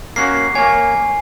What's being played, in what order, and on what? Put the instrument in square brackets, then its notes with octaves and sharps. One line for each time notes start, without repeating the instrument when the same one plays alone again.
[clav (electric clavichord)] A#3 C#4 F#4 [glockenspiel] C7
[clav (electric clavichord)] A#3 C#5 [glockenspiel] G#5